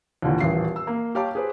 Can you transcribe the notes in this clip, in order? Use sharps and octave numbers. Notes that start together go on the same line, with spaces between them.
D#2 A#2 D3 E3
D#1 A1 F5 C7
E6
A#3
G4 C#5 F5 A5 D6
G#4 B4 C5